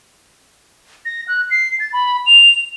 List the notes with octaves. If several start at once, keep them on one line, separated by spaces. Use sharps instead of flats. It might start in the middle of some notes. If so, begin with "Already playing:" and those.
A#6
F#6
C7
A6
B5
F7